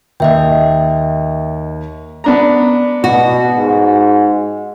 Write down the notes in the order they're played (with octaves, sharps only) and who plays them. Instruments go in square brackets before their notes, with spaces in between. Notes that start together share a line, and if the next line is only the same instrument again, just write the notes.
[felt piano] D#2 [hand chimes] D#5 E5 G5
[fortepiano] B3 D4 A#5
[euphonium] B2 [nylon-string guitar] F#4
[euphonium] G#2